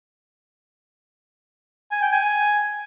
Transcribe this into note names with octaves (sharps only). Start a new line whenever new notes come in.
G#5
G5
G#5